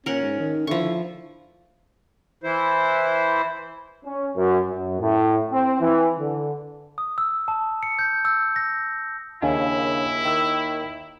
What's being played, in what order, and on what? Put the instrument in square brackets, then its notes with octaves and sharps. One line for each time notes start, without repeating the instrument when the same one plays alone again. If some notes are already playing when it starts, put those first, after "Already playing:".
[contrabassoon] A#2 [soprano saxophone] C#4 [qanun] A#4 F#5
[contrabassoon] G#2
D#3
[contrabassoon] D3 [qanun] F3 C#6 [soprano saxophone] E4
[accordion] E3 E4 C5
[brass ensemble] C#4
F#2
F#2
A2
C4
E3
D3
[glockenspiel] D#6
E6
A5
C#7
G6
E6
A#6
[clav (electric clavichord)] D#2 [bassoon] C#3 [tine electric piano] D4 F5 G#5 [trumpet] E4
[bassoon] D#3 [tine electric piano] G5 E6